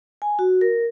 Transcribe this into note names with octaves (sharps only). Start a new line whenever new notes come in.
G#5
F#4
A#4